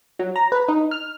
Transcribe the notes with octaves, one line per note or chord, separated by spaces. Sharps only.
F#3
A#5
B4
D#4
F6